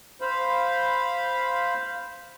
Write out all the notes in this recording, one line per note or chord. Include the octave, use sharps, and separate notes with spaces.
C5 F5 B5